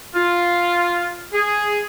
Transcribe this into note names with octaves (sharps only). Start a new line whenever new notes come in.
F4
G#4